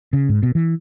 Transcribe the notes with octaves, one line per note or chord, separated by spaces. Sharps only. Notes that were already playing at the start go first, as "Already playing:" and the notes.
C#3
G#2
B2
E3